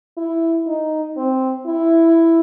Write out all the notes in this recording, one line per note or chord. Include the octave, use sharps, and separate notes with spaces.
E4
D#4
C4
E4